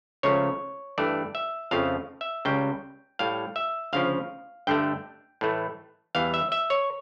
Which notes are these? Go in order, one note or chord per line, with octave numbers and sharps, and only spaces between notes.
C#2 C#3 F3 A3 C#5
G2 E3 A3 D5
E5
F2 C#3 F3 A3 F5
E5
C#2 C#3 G3 G5
A2 G3 F5
E5
D2 C#3 F3 F5
G2 D3 A3 G5
A2 E3 A3
E2 E3 G3 F5
E5
E5
C#5